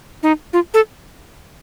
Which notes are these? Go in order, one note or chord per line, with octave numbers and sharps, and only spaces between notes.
D#4
F4
A4